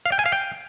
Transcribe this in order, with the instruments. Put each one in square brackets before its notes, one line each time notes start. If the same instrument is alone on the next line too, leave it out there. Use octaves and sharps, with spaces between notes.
[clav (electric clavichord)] F5
G5
G#5
F5
G5